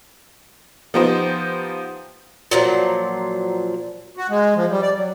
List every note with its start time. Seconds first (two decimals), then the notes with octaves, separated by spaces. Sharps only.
0.94 F3 B3 D#4 G4 C5
2.51 A#2 F3 F#3
4.17 F#4
4.29 G#3
4.56 F3
4.70 G3
4.82 D5
4.95 F#3